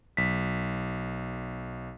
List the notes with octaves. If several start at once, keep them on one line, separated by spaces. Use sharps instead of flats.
B1 B6